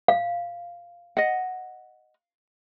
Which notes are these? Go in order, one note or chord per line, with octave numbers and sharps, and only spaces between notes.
F5
D#5 F#5